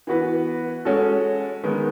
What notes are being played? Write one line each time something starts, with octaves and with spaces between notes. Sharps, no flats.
E3 B3 F#4 B4
G#3 C#4 F#4 A4
D#3 G#3 B3